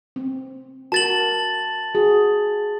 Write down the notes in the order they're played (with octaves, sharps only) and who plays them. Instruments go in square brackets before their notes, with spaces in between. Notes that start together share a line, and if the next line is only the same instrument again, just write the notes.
[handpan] C4
[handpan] F#4 A#4 [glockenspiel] A5 A6 F#7
[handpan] F#4 G#4